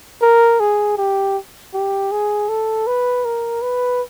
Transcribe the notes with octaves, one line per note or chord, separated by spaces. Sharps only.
A#4
G#4
G4
G4
G#4
A4
B4
A#4
B4